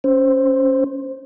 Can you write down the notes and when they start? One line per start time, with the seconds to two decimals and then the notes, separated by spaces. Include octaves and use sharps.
0.04 C#4 C5